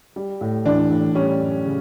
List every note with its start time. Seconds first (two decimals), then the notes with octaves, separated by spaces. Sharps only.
0.16 G3
0.41 A2
0.65 E3 D4
0.91 A2
1.15 G3 C#4
1.40 F#2
1.65 C#3